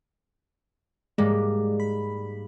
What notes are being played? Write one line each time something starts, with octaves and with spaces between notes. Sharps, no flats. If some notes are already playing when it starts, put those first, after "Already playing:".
G#2 G3 G#3 A#3
B5